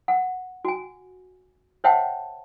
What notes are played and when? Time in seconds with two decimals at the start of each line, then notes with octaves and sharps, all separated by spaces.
0.08 F#5
0.64 F#4 G#5
1.84 C5 C#5 E5 F#5 G5 A5